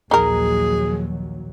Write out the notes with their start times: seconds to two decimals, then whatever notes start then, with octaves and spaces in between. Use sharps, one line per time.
0.11 A#1 D#2 F#3 D#4 G#4 A#4